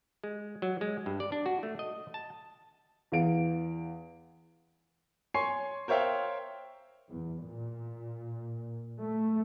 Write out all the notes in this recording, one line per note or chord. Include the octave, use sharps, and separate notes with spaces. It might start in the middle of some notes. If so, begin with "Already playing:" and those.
G#3
F#3
G#3
G2
D5
D4
F#4
A3
D#5
A5
E2 F5 D7
C#5 G#5 C6 C#6 C7
A#4 C5 C#5 E5 F5 G5
E2
A#2
A3